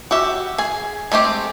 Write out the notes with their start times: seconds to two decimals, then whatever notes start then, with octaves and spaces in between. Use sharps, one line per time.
0.11 F#4 G4 E5
0.58 G#4 G#5
1.12 G#3 A3 C4 G4